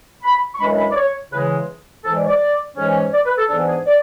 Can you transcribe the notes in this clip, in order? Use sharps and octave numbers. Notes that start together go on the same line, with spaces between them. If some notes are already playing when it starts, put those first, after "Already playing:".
B5
C#6
F#2 E3 G#3 D4 B5
B5
D5
C#5
C#3 E3 G#3 B4
G#2 E3 G#3 A4
D5
C#5
D5
G#2 E3 G#3 C#4
D5
B4
A4
G#2 E3 B3 D4 A4
G#4
D5